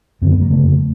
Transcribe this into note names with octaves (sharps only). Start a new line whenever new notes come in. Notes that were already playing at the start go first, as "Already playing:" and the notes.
F#2 D3 C4
B3
A#3
F2 C#3 A3